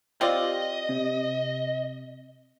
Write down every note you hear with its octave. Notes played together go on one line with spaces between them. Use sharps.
C4 F4 G4 D5 D#5
C3